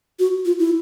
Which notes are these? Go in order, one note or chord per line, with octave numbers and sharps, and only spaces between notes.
F#4
F4
E4